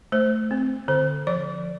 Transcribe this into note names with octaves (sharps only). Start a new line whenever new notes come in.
A3 C5
C4
D3 C5
F3 D5